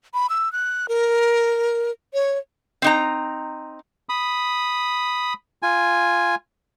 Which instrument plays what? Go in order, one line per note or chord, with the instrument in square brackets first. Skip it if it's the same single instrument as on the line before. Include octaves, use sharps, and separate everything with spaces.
[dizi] B5
E6
F#6
A#4
C#5
[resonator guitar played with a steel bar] C4 D#4 A#5
[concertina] B5 D#6
F4 G#5